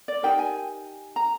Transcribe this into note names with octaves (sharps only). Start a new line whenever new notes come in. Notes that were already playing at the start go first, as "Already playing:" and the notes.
D5
D#4 G4 A#4 G5
G#5
A#5